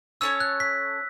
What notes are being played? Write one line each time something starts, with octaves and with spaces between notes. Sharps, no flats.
C#4 A4 C#5 E6
F#6
B6